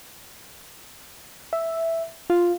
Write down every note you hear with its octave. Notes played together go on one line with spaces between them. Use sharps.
E5
F4